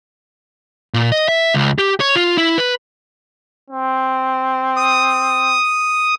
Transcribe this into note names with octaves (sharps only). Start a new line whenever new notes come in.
A#2
D#5
E5
C#2
G4
C#5
F4
E4
B4
C4
D#6